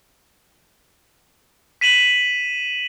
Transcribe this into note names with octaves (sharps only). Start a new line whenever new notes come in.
B6 D#7 E7 F#7